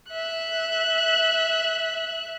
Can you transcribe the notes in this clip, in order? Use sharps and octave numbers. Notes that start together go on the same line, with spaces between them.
E5 F#6